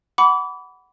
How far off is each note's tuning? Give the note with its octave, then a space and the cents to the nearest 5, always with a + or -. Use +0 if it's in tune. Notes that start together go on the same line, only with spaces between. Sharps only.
F#5 +10 B5 +0 D6 -30